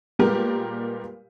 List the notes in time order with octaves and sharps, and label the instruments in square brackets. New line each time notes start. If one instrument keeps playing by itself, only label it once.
[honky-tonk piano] A#2 G3 G#3 B3 G4 A#4